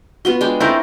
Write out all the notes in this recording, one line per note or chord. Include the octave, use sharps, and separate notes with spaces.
B3 F4 F#4 C6
G#3 D4 G5
A3 C4 D#4 E4 A#4 F5 C6 G6